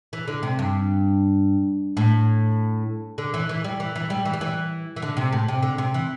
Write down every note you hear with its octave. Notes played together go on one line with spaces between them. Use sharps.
E3
D3
C3
G2
A2
D3
E3
E3
G3
E3
E3
G3
E3
G3
E3
E3
D3
C3
A2
C3
D3
C3
E3